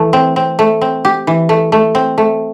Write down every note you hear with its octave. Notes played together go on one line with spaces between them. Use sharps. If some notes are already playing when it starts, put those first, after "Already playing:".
Already playing: E3 A3
C4
C4
A3
C4
G4
E3
A3
A3
C4
A3